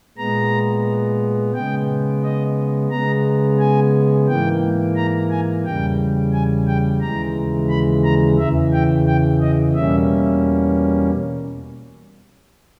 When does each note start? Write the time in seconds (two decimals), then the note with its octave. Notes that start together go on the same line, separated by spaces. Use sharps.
0.17 A#2 G#3 B3 A#5
1.54 C#3 G#3 B3 G5
2.23 D#5
2.91 C#3 G#3 B3 A#5
3.59 G#5
4.27 G#2 E3 A#3 G5
4.96 A#5
5.30 G#5
5.64 E2 C#3 G3 G5
6.33 G#5
6.67 G5
7.01 D#2 C#3 E3 G#3 A#5
7.69 B5
8.04 A#5
8.38 E2 C#3 E3 E5
8.73 G5
9.07 G5
9.41 D#5
9.75 E2 B2 G3 A#3 C#4 E5